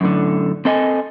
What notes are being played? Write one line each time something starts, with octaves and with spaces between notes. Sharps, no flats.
F#2 A2 D3
C4 A4 D#5 G5 G#5